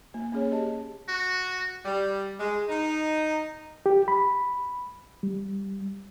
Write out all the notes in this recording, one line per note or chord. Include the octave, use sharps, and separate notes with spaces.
A#3
A#3 C#4 G#4 C#5
G4 D#5 A5
F#4
G3
G#3
D#4
G4
B5
G3